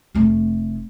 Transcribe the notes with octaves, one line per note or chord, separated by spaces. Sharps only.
F1 A3